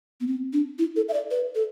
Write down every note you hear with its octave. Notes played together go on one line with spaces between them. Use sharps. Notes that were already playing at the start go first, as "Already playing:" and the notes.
B3
C4
D4
E4
A4
E5
D5
B4
A4